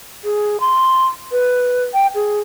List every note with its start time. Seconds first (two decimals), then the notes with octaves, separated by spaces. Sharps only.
0.25 G#4
0.60 C6
1.32 B4
1.94 G5
2.15 G#4